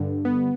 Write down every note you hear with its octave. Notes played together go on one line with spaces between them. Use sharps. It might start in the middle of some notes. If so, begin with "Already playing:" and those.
Already playing: G2 D3
B3